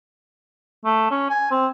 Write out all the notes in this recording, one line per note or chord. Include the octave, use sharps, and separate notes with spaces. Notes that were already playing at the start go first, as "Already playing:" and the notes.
A3
C#4
G#5
C4